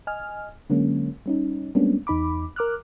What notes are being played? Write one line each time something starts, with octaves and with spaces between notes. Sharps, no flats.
D#5 G#5 F6
D3 F#3 G#3 A#3 C#4
G3 C#4 D#4
G3 G#3 A#3 B3 C#4 D4
E2 D#4 B5 D6
A#4 D6 F6 F#6